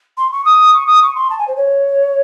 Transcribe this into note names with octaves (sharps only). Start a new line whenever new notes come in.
C6
C#6
D#6
C#6
D#6
C#6
C6
A5
G#5
C5
C#5